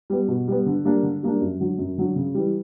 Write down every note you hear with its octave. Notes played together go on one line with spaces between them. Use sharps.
G3 B3
B2
G3 B3
D3
G3 A#3 D4
D3
G3 A#3 D4
F#2
D3 F#3
F#2
D3 F#3
C#3
E3 G3